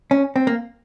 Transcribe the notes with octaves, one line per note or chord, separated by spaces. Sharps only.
C#4
C4
A#3